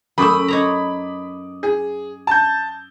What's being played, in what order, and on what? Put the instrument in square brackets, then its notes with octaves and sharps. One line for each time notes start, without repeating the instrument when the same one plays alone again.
[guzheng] F#2 A3 [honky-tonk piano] B5 D6 D#6
[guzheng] D#4 C#5 A#5
[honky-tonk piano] G#4
A5 G6